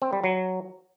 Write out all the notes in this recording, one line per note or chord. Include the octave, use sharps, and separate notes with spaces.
C4
G3
F#3